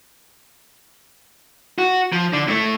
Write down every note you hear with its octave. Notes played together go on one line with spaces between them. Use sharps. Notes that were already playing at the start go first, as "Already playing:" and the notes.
F#4
F3
D3
A2 A3